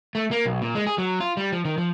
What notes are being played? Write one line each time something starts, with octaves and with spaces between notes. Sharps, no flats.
A3
A#3
B1
A#2
G#3
G#4
F#3
F4
G3
F3
D#3
F3